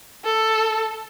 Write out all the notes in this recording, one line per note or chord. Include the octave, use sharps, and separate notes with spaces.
A4